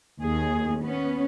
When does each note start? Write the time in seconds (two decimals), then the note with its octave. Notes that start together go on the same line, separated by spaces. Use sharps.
0.22 D#2 G#4
0.81 B3 C#4